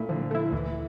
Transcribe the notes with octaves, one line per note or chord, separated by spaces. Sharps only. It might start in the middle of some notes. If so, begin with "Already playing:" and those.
Already playing: A#2 A3 E4
D3 F3
A3 E4
D2 E3